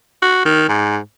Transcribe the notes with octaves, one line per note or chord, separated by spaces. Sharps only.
F#4
D#3
G#2